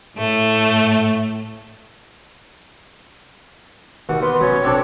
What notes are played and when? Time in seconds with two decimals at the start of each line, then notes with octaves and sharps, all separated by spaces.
0.18 A2 A3
4.09 D#2 F#4
4.22 B3 C6
4.41 F#2 C#5
4.63 C4 D4 A4